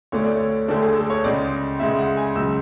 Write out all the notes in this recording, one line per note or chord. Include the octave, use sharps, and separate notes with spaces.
D2 D3 A3 D4 C#5
D5
C#5
D2 D3 A3 D4 A4
G#4
A4
C#5
C#2 C#3 G#3 D5
C#2 C#3 G#3 E5
F#5
G#5
C#2 C#3 F#3 E6